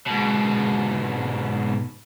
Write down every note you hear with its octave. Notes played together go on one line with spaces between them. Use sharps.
G#2 B2